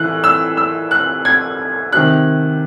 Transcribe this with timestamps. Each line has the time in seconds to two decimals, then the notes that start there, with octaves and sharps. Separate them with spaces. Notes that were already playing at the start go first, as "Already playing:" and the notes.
Already playing: A2 E3 F#6
0.24 E6
0.57 E6
0.91 F#6
1.25 G#6
1.93 C3 D#3 F#6